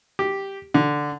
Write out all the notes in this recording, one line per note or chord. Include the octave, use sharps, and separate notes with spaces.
G4
D3